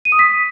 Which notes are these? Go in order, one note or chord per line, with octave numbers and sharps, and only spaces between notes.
D#7
D#6
B6